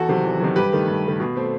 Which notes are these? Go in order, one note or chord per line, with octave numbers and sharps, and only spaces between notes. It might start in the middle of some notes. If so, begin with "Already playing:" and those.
Already playing: E2 F#4 A4
C3 D#3 F#3
E2
C3 D#3 F#3
G2 G4 B4
D#3 A3
G2
D#3 A3
B2
A3 C4